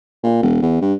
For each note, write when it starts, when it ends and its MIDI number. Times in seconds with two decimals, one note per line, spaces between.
0.23 0.40 46
0.42 0.62 28
0.62 0.81 40
0.81 0.93 43